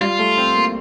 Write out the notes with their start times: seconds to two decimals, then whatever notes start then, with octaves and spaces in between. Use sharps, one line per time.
0.01 G3 F4
0.19 A3
0.37 C4
0.55 A#3